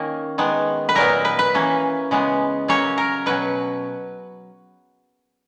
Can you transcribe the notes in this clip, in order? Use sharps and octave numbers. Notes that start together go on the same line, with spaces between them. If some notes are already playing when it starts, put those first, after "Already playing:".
Already playing: D#3 A#3 C#4
D#3 G#3 B3
B4
A#2 F#3 B3 A#4
B4
B4
E3 A#3 C#4
C#3 G#3 B3
C#3 F#3 A#3 C#4 C#5
A#4
B2 F#3 C#4 B4